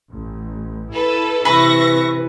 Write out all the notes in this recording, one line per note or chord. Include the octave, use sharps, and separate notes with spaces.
A1
E4 A4 B4
C3 E3 B4 E5 C#6 A#6